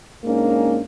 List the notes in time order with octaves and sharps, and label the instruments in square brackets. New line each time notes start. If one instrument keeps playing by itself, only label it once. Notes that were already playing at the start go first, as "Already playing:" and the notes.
[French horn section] G#2 A#3 C#4 D4